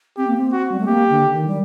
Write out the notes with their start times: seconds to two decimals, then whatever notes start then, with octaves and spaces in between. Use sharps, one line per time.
0.17 C4 G4
0.27 A#3
0.37 C4
0.52 F#4
0.72 G3
0.80 A3
0.87 A#3 G4
1.10 D3
1.34 D#3
1.48 G3